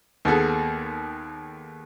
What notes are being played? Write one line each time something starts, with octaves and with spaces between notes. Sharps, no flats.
D#2 B3 G#4 A4